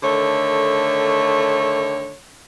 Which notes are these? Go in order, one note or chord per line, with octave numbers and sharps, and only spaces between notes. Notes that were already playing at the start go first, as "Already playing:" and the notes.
D3 D#3 A3 C#5